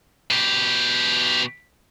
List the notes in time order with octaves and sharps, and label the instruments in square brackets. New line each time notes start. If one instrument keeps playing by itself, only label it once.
[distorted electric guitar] B2 G4